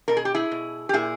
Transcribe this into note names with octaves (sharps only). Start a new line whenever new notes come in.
B2 A#4
G#4
G4
E4 G#4
B2
G4
A#2 E4 G#4